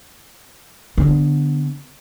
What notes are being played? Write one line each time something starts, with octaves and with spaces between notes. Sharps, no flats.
D3 B3